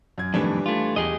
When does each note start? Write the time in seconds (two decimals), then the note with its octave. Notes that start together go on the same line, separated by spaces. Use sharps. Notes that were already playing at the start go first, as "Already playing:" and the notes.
0.18 F#2 G#6
0.34 F2 A2 D#3 E3 G3 D4
0.66 A3 F4
0.96 E2 G4 G#4 D#5